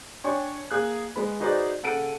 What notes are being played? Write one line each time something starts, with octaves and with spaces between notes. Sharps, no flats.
D4 C#5 G5 G#5 C#6
A#3 G#4 F#6
G#3 B3 B5
D#4 F#4 G#4 B4 C5 D5
C#3 A4 F#5 D7 D#7